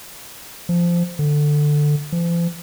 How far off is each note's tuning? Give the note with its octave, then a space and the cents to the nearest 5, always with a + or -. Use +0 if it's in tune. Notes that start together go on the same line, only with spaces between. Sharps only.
F3 -15
D3 +10
F3 -45